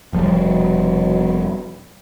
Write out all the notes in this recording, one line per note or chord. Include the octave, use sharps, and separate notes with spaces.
F1 B2 F3 G3